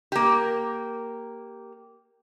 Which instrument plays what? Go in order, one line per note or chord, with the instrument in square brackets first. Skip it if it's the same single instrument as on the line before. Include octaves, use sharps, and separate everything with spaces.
[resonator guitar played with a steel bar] A#3 G4